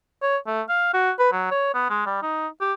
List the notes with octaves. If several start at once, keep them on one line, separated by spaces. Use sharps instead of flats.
C#5
A3
F5
F#4
B4
F#3
C#5
B3
G#3
G3
D#4
G4